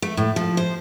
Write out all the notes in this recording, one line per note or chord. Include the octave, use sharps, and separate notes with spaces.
A3
A2
F3
C5